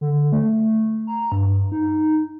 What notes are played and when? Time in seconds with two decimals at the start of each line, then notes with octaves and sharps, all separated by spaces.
0.01 D3
0.32 A3
1.07 A#5
1.32 G2
1.72 D#4